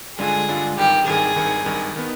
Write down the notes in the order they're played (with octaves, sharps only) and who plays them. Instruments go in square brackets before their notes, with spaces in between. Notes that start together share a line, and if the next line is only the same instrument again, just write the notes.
[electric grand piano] G2 D3 G#3 D4 F4 [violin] G#4
[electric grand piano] G2 D3 G#3 D4 F4
[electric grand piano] G#1 G2 D#3 [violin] G4
[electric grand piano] G#1 G2 D#3 [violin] G#4
[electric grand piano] G#1 G2 D#3
G#1 G2 D#3
D#3 B3